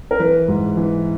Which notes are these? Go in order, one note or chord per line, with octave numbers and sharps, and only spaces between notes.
A#4
E3 B4
G#2
E3